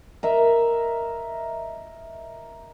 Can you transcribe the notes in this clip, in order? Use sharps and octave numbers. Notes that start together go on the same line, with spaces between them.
A#4 D#5 E5